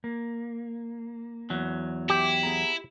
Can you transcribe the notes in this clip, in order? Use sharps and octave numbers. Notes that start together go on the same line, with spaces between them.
A#3
E2 F#3
E4 G4
B3 G#4 A#5